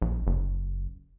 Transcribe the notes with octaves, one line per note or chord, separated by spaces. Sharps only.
A#1
F#1